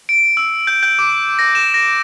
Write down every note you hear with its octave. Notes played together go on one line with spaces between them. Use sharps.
D7
E6
G6
G6
D6
A#6
E7
A#6